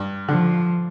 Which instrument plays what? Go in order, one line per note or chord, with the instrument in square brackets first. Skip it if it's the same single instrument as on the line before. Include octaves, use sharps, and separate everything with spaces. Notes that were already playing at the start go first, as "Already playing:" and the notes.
Already playing: [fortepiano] G2
[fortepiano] D3 [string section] F3